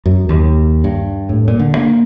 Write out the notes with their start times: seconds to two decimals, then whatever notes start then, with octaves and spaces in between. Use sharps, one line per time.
0.06 F#2
0.29 D#2
0.84 G2
1.29 A2
1.48 A#2
1.60 D3
1.77 A#3